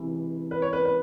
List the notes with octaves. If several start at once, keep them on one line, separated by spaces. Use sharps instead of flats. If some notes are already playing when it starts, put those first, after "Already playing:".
Already playing: C#2 C3 E3
B4
C#5
B4
B4